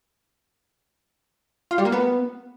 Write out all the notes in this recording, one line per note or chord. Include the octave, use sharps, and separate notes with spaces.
F4
G3
A#3
B3